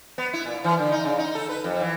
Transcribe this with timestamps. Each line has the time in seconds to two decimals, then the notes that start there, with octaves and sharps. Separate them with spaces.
0.18 B3
0.33 E4
0.46 A#2
0.64 E3
0.79 D3
0.92 D#4
1.05 C#3
1.18 D#4
1.35 A4
1.49 B4
1.64 F2
1.81 E3